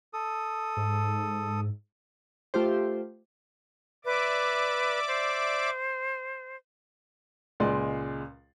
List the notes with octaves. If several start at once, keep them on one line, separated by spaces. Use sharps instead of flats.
A4 D#6
G#2
A3 F4 G4 C5
B4 D5 E5 D6
C5
C#2 A#2 G#3 D5 C6